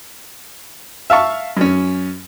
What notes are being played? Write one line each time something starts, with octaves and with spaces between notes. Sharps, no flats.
E5 F5 A5 C#6
F#2 C#4